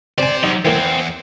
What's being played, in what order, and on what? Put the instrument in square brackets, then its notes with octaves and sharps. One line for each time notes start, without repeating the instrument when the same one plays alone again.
[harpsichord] C4 G#5 [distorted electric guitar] G4 C5 [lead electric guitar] D5
[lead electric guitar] F#3 G3 [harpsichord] D#4
[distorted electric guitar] E2 [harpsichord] E3 A#3 [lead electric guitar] C5 G5